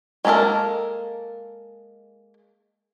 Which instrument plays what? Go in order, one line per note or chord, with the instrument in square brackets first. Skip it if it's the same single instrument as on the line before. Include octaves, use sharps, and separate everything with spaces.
[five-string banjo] G#3 A#3 C#4 A4 A#4